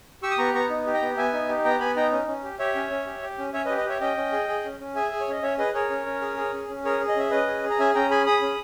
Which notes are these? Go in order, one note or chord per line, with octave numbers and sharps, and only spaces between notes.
G4 C#6 E6
D#6
B3 A#5 C#6
B3 A#5 C#6
D#4
G4
G5 A#5
B3
B3 E5 G#5
D#4
G4
B3 G5 A#5
B3 G#5 B5
D#4 G5 A#5
C#4
C#4
G4
G4 C#5 E5
C#4
C#4
G4
G4
C#4
C#4 C#5 E5
B4 D#5
G4
B4 D#5
G4 C#5 E5
C#4 D#5 G5
C#4
G#4
G#4
C#4
C#4
G#4 E5 G#5
G#4
C#5
C#4 D#5
C#4 C#5 E5
G#4 B4 D#5
G#4 A#4 C#5
C#4
C#4
G#4
G#4
C#4
C#4
G#4 A#4 C#5
G#4
D#5
C#4 E5
C#4 B4 D#5
G#4
G#4
A#5
C#4 E5 G#5
C#4 G5 A#5
G#4 G#5 B5
G#4 B5 D#6
C#4